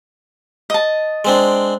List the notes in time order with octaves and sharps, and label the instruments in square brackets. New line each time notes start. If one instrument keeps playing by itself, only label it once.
[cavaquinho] D#5 A5
[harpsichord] G#3 C4 D4